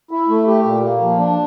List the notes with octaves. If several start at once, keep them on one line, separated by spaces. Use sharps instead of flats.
E4
A3
G4
A#2
A#3
F3
D4